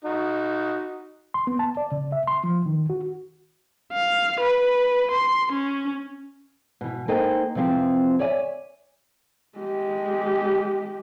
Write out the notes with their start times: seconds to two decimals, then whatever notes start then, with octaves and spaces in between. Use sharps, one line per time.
0.05 D#4 F#4
1.34 C6
1.47 B3
1.59 A5
1.77 D5
1.92 C#3
2.12 E5
2.27 C6
2.44 F3
2.66 D#3
2.90 F#4
3.93 F5
4.40 B4
5.11 C6
5.52 C#4
6.81 B2 E3
7.08 A#3 D#4 A4 C5 G5 G#5
7.55 C3 E3 F3 C4 G4 G#4
8.19 C#5 D5 E5 G#5
9.58 G#3 G4